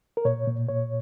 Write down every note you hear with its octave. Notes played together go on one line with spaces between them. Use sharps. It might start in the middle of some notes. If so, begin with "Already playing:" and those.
A#4
A#2 C#5
A#2
A#2 C#5